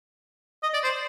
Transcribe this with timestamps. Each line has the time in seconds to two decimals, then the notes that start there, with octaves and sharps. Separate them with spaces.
0.63 D#5
0.74 D5
0.84 C5